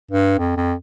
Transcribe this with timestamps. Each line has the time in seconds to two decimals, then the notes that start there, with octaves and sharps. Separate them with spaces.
0.11 G2
0.38 F2
0.57 F2